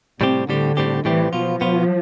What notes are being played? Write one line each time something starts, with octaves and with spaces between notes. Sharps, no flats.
A2 C3 G3 C4 G4
A2 D3 G3 C4 G4
A2 G3 C4 G4
A2 E3 G3 C4 G4
B2 F3 B3 F4
B2 B3 F4